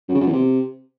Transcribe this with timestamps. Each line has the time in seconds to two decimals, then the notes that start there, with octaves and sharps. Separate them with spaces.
0.08 F#2
0.15 C#3
0.21 F#2
0.27 E2
0.33 C3